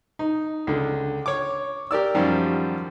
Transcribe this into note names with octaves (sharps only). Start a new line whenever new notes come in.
D#4
C#2 D3
C#5 D6
G4 A#4 D5 E6
F#2 D#3 F3 G3